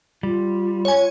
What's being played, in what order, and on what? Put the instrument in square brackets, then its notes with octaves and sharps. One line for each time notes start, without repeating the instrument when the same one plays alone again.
[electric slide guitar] G3 [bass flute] F4
[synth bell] C#5 G#5